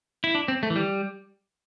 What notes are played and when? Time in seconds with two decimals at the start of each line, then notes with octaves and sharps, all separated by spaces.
0.24 E4
0.35 D4
0.48 C4
0.63 A3
0.70 E3
0.76 G3